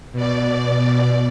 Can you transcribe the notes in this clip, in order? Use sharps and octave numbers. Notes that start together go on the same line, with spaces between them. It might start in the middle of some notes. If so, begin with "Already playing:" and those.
B2 D5